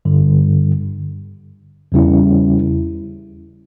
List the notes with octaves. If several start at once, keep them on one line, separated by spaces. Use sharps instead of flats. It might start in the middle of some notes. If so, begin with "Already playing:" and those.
G2 D3 G3
E2 C#3 G3 C#4 E4